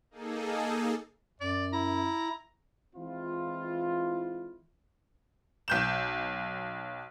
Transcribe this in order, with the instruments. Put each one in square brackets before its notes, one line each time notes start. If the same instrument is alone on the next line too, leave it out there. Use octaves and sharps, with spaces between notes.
[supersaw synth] A#3 D#4 G#4 A4
[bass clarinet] F#2 [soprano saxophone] D5
[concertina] E4 [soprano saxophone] A#5
[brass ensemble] E3 G#3 C4 E4 F4
[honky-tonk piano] B1 G6 E7